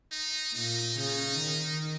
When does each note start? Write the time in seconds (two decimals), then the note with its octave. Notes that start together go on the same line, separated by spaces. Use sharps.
0.11 D#4
0.55 A#2 D#4
0.97 C#3 D#4
1.41 D#3